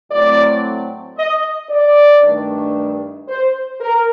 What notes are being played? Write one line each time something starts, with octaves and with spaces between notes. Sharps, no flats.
A2 F#3 A3 C4 D5
D#5
D5
G2 D#3 A3 D4
C5
A#4